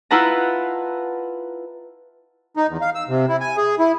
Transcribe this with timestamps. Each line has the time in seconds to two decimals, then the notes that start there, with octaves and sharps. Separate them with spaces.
0.11 E4 F4 B4 F#5 A5 A#5
2.57 D#4
2.69 E2
2.81 F5
2.95 E6
3.09 C3
3.29 E4
3.41 G#5
3.57 G#4
3.79 E4